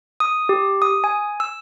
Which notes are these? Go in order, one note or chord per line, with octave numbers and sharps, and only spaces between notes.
D#6
G4
D#6
G#5
E6